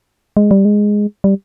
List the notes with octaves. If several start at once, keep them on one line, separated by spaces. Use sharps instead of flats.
G#3
G3
G#3
G3